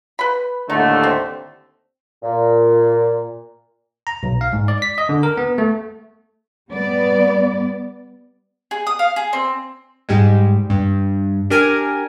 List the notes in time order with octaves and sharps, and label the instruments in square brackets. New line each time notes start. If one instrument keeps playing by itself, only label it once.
[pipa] B4 B5
[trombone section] D#2 A2 D3 [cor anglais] A3 [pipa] D#4
[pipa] C4
[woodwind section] A#2
[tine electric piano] A#5
B1
F5
G#2
D5
B6
D#5
D3
A#4
B3
A3
[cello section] G3 B3 D5
[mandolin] G#4
D#6
F5
G#4
C4
[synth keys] G#2 G3 G#3
G2
D4 G4 A#4 G#5